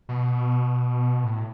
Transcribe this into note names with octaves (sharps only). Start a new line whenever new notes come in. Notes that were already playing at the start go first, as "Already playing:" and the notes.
B2
A2